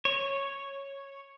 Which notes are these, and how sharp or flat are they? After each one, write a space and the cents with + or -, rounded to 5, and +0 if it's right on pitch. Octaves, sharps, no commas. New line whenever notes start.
C#5 -5